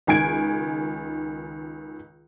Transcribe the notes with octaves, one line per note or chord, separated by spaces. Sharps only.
C#2 D#3 G#5 G#6 D7